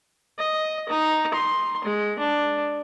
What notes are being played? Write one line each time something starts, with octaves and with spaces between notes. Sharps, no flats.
D#5
D#4
C6
G#3
D4